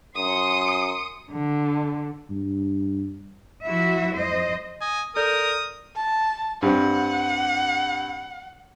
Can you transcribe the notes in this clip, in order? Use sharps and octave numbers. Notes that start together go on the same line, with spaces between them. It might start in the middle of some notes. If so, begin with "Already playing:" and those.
F#2 C6 D#6 C#7
D3
G2
F3 E4 F#4 E5
F2 C5 D#5
D#5 G#5
A4 A#4 D5 D#6 G6
A5
G2 G3 C4 F#5